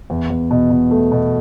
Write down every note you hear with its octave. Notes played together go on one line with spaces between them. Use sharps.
E2
E2
B2
B2
A3
B2